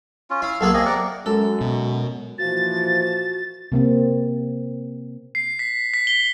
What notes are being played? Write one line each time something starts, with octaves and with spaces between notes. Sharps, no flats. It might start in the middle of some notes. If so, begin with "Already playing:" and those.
C#4 F4
E4 F5
B1 A#3 G#4 A4 F5
C3 A#3 G#4 D#5
A#4 D5 F#5
F#2 G#3 F#4 A4
B2
A#2 E3 F3 F#4 A6
C3 A#3 C4
C7
B6
B6
G7